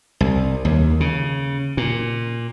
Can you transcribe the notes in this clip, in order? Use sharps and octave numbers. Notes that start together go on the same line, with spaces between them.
C2
D#2
C#3
A#2